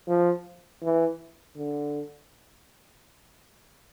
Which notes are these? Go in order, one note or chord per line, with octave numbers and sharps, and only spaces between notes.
F3
E3
D3